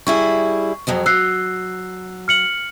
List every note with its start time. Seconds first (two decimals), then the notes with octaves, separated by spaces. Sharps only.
0.07 G3 E4 G#4 C#6
0.87 F2 F#3 G#3
1.06 F#3 E6 F#6 C7
2.28 F6 C#7 F#7